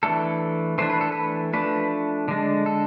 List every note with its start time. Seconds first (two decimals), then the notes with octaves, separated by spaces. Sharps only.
0.03 E3 A3 D4 A4
0.78 E3 A3 D4 C5
0.90 B4
1.01 A4
1.12 B4
1.53 F3 A3 D4 B4
2.28 D3 G#3 D4
2.66 A4